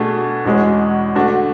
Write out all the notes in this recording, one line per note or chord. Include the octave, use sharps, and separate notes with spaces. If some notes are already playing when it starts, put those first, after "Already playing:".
Already playing: B2 A3 D4 G#4
E2 B2 G#3 C#4 G#4
D3 A3 D4 F#4